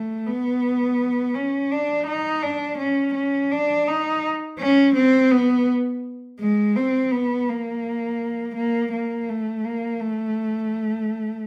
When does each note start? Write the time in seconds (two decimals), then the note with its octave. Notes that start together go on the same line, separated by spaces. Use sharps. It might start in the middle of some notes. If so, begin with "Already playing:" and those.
Already playing: A3
0.26 B3
1.35 C#4
1.71 D4
2.07 D#4
2.42 D4
2.78 C#4
3.15 C#4
3.51 D4
3.87 D#4
4.59 C#4
4.95 C4
5.31 B3
6.40 G#3
6.76 C4
7.11 B3
7.48 A#3
8.56 A#3
8.92 A#3
9.29 A3
9.64 A#3
10.00 A3